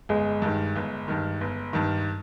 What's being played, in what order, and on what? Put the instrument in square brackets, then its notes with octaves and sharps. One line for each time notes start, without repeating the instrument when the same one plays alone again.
[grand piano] G1 [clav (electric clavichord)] G#3
[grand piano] G2 D#3
G1
G2 D#3
G1
G2 D#3